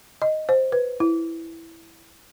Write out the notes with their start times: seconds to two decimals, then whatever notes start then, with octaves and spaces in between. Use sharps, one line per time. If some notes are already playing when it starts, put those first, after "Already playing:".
0.22 D#5
0.49 C5
0.72 B4
1.00 E4